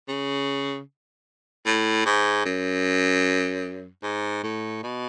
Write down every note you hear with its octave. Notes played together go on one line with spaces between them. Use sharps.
C#3
A2
G#2
F#2
G#2
A2
B2